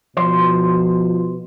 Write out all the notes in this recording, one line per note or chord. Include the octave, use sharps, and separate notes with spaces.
B2 F3 C5